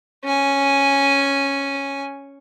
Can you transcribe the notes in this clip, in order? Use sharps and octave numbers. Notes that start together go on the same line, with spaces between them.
C#4 G#5